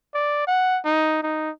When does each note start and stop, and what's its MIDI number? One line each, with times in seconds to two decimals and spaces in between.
0.14 0.44 74
0.47 0.80 78
0.85 1.22 63
1.23 1.50 63